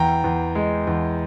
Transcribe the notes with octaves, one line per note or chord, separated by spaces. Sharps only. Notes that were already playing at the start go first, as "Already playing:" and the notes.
Already playing: E2 G5 A#5
E2
G#3
E2